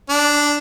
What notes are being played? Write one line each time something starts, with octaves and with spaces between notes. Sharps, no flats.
D4